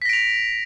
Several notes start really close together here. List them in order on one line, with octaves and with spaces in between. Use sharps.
B6 A#6 D7 F7